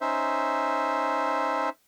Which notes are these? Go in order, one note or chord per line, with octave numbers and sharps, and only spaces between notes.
C#4 D#4 C5 E5